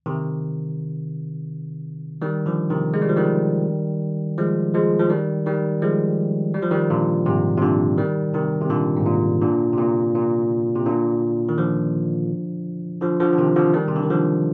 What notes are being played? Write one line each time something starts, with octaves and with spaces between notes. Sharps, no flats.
C3 D#3
D#3 G3
D3 F3
C3 D#3
G#3
G3
F3
D#3 G3
F3 G#3
F3 G#3
F3
D#3 G3
D#3 G3
F3 G#3
G3
F3
D#3 G3
A#2 D3
G#2 C3
C3
A#2 D3
D#3 G3
C3 D#3
C3
A#2 D3
G#2
A#2
A#2 D3
C3
A#2
A#2
C3
A#2 D3
D#3
D3 F3
D3 F3
D3 F3
D3
C3 D#3
D3 F3
D#3 G3
C3
D3
D#3
D3 F3